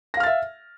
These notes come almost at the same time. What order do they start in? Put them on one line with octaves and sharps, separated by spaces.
A#6 F5 F6 A6 E5